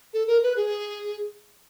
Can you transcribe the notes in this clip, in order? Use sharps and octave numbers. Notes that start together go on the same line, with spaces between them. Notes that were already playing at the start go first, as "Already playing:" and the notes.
A4
A#4
B4
G#4